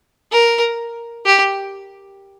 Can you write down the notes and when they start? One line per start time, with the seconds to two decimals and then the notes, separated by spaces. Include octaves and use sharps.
0.32 A#4
1.26 G4